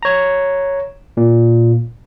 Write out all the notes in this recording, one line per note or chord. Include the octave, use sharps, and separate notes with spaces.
C#5 A#5
A#2